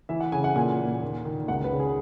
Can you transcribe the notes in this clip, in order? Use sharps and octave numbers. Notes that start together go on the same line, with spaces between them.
E3 E5
F#5
C#3 G#5
F#5
A#2 G#5
A#2
D#2
D#3
C#2 F#5
B4
C#3
G#4